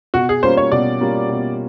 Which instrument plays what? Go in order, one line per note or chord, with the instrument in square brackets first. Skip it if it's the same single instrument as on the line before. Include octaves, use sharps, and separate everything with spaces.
[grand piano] B2 [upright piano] F#4
[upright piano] G#4
[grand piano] G3 A#3 C#4 F4 [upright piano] C5
[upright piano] C#5
[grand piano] B2 [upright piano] D5
[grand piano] G3 A#3 C#4 F4
B2